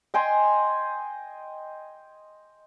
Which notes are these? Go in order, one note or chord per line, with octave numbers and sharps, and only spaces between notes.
D#5 G5 G#5 C6